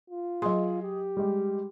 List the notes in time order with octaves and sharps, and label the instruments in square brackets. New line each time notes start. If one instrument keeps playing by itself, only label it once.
[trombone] F4
[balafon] F#3 C6 [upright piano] G#4 D#5
[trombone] G4
[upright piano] G3 G#3